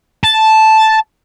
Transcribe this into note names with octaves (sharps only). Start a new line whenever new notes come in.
A5